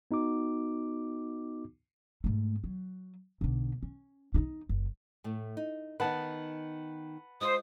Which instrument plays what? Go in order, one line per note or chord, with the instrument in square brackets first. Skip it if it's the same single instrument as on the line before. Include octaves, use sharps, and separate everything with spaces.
[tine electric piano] B3 D#4 F#4 D6
[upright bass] G#2 A3
F#3
B1 D3
C#4
G2 D#4
F#1
[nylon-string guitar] A2 A3
D#4
[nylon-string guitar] D#3 B3 D#4 [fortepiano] B4 F#5 A5
[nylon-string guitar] G#3 F4 [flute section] C5 [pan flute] D#6